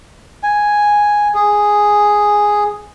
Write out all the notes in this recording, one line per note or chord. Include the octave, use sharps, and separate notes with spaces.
G#5
G#4